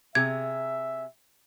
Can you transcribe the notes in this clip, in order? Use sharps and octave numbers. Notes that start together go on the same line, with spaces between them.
C3 G#4 E5 G#6